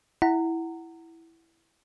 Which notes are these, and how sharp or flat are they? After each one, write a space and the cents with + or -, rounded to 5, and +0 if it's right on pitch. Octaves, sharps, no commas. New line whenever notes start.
E4 +0 F#5 +10 A#5 -25